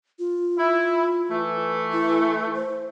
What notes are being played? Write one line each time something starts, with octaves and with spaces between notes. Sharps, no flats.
F4
E4
E3 A3
E4
C5